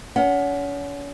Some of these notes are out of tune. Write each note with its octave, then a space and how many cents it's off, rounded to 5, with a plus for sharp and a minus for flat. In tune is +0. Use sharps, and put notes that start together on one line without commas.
C#4 +40 F#5 +0